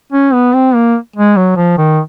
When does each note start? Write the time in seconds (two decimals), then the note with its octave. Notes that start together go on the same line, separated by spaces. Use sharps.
0.13 C#4
0.34 B3
0.55 C4
0.75 A#3
1.16 G#3
1.37 F#3
1.56 F3
1.78 D#3